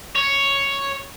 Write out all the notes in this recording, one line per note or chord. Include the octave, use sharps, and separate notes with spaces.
C#5